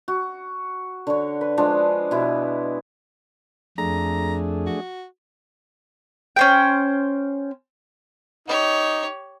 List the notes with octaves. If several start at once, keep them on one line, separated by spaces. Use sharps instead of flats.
F#4
D3 C#5
B4
F3 G#3 D4
B2 E4
F2 A3 D4 G#4 A#5
F#4
C#4 C5 G5
D#4 G4 C#5